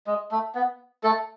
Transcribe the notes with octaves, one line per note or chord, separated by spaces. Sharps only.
G#3
A3
B3
A3 A4